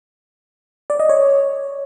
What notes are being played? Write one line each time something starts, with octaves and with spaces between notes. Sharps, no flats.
D5
D#5
C#5